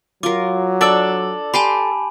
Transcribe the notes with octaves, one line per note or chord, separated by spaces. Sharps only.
F#3 F4 A#4 D6
D4 A4 D5 D6 E6 F#7
G4 G#5 A5 B5 C6 D6